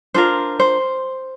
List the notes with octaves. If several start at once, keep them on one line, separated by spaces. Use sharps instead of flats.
D4 F4 A#4 C5
C5